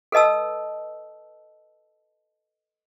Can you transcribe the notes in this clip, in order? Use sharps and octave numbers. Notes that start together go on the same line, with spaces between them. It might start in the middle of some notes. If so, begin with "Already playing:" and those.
A4 B4 D#5 A5 E6